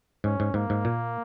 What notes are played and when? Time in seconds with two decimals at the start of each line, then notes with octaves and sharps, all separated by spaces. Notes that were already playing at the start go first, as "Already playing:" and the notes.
0.24 G#2 C#4
0.40 G#2
0.54 G#2 A#3
0.70 G#2
0.85 A#2